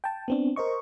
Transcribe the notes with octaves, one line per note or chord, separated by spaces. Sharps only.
G5 A5
B3 C4 D4
A#4 C5 D#5 C#6